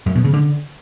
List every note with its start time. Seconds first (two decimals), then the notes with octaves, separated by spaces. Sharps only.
0.06 F#2
0.15 B2
0.24 C#3
0.34 D3